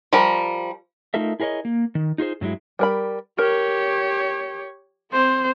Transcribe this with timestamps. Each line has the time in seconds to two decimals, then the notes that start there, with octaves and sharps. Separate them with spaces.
0.13 F3 G3 A#4
1.14 A3 D#4 F4 A4 A#4 E5
1.40 E4 G#4 A#4 C#5 D#5
1.65 A#3
1.95 D#3
2.18 D#4 F4 G#4 C5
2.41 G2 F#3 G#3 E4
2.79 G3 A#4 B5
3.39 G4 A#4 C#5
5.11 C4 C5